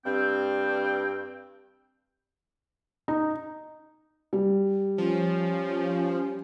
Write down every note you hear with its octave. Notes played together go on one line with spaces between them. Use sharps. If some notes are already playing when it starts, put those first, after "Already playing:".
G2 C4 G5
D#4
G3
F3 C#4